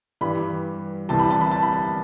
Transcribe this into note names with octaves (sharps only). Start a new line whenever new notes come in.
G2 E3 G3 B5
C2 C3 E3 G3 A5
B5
A5
B5
A5
B5
A5